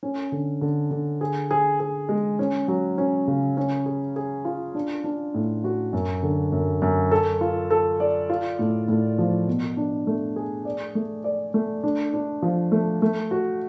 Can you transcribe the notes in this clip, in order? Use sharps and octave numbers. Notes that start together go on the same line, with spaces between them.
C#4
D3
D3
D3
G#4
G#4
G#4
G#3
C#4
F#3
C#4
C#3
C#4
G#4
G#4
F4
D4
D4
A2
F#4
F#2
D3
F#2
F#2
A4
F4
A4
D5
F4
A2
A2
F3
B2
D4
A3
G#4
D5
A3
D5
A3
D4
D4
F3
A3
A3
F#4